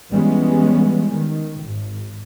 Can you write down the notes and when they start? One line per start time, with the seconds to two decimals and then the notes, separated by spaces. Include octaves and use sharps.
0.11 E3 G3 G#3 B3 C#4
1.13 D#3
1.62 G#1